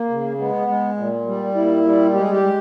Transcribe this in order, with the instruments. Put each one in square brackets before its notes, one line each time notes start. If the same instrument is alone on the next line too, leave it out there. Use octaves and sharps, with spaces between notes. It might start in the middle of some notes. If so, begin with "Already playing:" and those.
Already playing: [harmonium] A#3
C#3
G#3 B3
G#3
A#2
G3
A#2 E4
G3
G#3 G4
G#4
G4
G#3